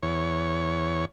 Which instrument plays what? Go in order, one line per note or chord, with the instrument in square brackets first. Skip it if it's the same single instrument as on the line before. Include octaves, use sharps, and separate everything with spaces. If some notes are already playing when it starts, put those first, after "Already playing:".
[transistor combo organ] E2 C#5